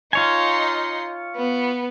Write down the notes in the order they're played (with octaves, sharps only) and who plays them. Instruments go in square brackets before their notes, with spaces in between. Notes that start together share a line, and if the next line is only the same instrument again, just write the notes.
[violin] D#4 C6 [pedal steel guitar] F4 C#5 G#5
[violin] B3